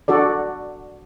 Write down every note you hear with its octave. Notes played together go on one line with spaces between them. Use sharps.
D4 F#4 A4 D5